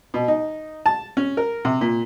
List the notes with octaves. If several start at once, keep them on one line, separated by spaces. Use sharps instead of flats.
B2
D#4
A5
C#4
A#4
C3
A#2